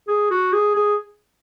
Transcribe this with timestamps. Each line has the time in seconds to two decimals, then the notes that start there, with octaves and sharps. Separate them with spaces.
0.08 G#4
0.31 F#4
0.53 G#4
0.75 G#4